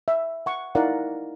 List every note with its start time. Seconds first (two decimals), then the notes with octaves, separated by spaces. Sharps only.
0.08 E5
0.46 F#5 C#6
0.75 D#4 E4 A#4 D5 F5 F#5